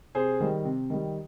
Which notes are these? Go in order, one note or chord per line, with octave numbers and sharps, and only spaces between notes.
C3 G#4 C5
D#3 G3
C3
D#3 G3